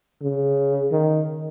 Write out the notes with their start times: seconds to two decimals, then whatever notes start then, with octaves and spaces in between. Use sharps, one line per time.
0.22 C#3
0.92 D#3